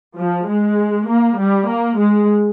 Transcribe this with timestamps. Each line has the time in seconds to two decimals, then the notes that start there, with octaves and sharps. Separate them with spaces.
0.18 F3
0.47 G#3
1.08 A#3
1.38 G3
1.68 A#3
1.98 G#3